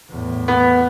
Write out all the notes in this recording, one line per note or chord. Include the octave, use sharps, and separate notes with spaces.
E2 A2
B3